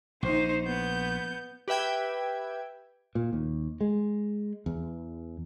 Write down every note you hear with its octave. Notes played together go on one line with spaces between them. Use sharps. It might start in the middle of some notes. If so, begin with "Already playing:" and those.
A#1 D#4 C5
B3 G6
G4 B4 E5 G5 G#6
A#2
D#2
G#3
E2